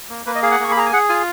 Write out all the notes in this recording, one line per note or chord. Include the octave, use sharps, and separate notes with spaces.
A#3
A#3 B4
D#5
G#4 F5
F#5
A#3 C#6
B5
G#4 A#5
G#5
G#4 F#5
F4 G#5